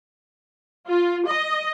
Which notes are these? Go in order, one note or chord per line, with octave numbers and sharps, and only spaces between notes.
F4
D#5